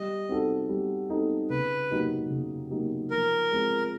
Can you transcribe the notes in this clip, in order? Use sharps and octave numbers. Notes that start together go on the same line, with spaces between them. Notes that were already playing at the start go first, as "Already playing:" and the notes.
Already playing: G3 D#5
C4 D#4 F#4 A4
G3
C4 D#4 F#4 A4
C#3 B4
F#3 A#3 D#4 G4
C#3
F#3 A#3 D#4 G4
F3 A#4
G#3 C4 F4